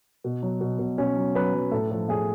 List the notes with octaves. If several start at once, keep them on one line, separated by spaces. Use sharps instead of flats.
B2
F#3
B2
B2
B2 C#4
F#3
F#3 B4
F#3
A2 A4
F3 A4
A2 G#4